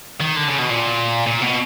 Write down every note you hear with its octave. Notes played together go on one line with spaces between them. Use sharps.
D#3
D3
C#3
B2
A#2
A#2
B2